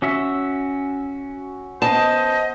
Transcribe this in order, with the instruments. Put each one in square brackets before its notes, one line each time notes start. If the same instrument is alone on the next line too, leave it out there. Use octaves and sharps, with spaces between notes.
[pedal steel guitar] C#4 F#4 E5
[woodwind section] B3 C5 D#5 [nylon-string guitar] A5